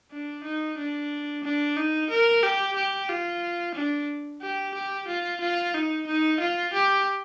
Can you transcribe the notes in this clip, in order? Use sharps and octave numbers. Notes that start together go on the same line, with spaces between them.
D4
D#4
D4
D4
D#4
A#4
G4
G4
F4
D4
G4
G4
F4
F4
D#4
D#4
F4
G4